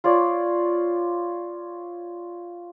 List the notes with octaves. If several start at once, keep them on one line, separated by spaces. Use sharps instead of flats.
F4 C#5 D5